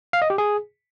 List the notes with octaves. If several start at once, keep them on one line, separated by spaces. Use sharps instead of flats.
F5
D#5
G4
G#4